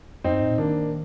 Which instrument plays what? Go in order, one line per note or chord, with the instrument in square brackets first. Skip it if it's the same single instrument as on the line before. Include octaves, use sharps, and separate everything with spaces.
[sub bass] F2 [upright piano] C4 D#4
[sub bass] G2
A2
A#2
[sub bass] D#3 [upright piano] A#3 D4